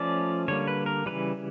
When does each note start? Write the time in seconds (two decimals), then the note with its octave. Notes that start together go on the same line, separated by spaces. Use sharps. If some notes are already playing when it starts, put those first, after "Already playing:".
Already playing: F3 A3 C#4 D5
0.48 D3 G3 A#3 C#5
0.67 B4
0.86 A#4
1.06 C#3 E3 G3 B4